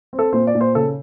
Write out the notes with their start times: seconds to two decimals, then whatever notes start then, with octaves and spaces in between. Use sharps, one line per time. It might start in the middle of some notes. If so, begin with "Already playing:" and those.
0.13 C4
0.19 A4
0.33 A#2 C5
0.47 D5
0.55 A#2
0.61 C5
0.75 C#3 A4